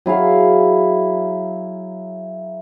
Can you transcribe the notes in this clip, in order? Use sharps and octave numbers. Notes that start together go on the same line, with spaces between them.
F#3 E4 G#4 F5